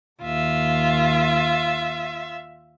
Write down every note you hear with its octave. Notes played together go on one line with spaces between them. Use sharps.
D#2 F4 E5